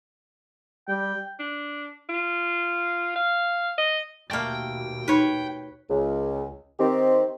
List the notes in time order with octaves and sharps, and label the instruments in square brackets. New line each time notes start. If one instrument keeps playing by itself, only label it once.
[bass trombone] G3 [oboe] G5
[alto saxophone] D4
F4
F5
D#5
[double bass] D#2 B2 [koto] A3 A#3 [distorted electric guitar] G5
[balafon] D#4 [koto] B4 C#5
[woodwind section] C#2
D#3 C4 G4